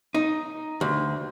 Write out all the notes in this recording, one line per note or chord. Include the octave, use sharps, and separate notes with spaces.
D#4
D2